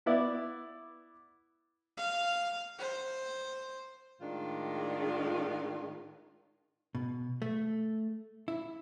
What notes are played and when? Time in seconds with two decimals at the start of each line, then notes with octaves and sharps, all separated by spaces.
0.06 B3 E4 D5
1.97 F5
2.79 C5
4.20 A2 D#3 G#3 D4 F4
6.95 B2
7.42 A3
8.48 E4